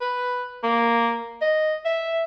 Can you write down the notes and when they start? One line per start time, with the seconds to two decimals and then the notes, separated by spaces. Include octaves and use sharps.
0.01 B4
0.63 A#3
1.42 D#5
1.85 E5